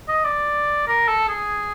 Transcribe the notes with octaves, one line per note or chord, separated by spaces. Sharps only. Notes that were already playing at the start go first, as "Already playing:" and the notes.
D#5
D5
A#4
A4
G#4